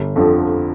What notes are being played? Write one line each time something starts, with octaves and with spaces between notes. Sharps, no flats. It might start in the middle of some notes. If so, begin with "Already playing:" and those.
Already playing: G1
F2 D3 F3